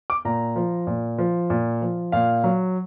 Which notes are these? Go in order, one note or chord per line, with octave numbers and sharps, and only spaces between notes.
D6
A#2 A#5
F3
A#2
F3
A#2
F3
A#2 F5
F#3